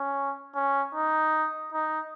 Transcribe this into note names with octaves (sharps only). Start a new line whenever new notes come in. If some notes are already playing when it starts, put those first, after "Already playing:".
Already playing: C#4
C#4
D#4
D#4